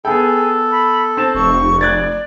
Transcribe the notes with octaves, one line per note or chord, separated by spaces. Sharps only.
B3 G#4 A4 G5
B5
C4 A5 E7
F1 C#6
D5 F#6 G#6 A6